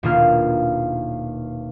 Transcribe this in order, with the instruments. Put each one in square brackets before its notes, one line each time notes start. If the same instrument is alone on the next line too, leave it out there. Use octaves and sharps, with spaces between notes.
[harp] D#1 B2 A#3 D4 F4 F6